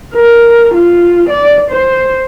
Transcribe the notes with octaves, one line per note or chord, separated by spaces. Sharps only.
A#4
F4
D5
C5